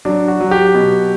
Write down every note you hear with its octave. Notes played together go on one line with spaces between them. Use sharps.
F#3 D4
F#4
F#3
G4
B2